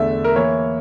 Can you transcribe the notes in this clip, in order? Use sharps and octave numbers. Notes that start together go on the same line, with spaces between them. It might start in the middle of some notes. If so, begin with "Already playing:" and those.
Already playing: E2 D3 A3 E5
A#4
E3 A#3 E4 C#5